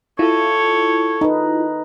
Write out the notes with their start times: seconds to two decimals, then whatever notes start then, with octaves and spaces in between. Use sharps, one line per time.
0.19 E4 F4 A4 C#5
1.21 D#4 B4